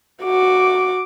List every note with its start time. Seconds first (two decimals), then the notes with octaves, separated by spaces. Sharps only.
0.23 F#4 D6